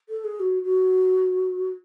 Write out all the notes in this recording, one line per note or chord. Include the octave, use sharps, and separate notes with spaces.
A4
G#4
F#4
F#4